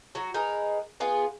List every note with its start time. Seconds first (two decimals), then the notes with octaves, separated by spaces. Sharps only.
0.15 F#3 F#4
0.34 D#4 G#4 A#4 B4
1.00 B3 F4 G#4